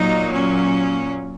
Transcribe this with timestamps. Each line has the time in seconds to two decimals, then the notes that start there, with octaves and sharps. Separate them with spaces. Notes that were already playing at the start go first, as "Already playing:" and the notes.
Already playing: A#2 F#3 A#3 D#4
0.33 C#4